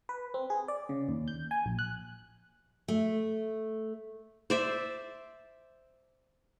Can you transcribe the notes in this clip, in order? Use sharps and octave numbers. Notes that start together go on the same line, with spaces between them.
B4
C4
G#4
D5
C#3
D#2
G6
G#5
A#1
F#6
A3
C5 D5 E5